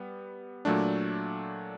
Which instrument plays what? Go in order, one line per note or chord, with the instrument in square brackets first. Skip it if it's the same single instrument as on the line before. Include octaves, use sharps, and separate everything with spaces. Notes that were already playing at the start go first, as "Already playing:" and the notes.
Already playing: [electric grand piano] G3 B3
A#2 F#3 A3 D4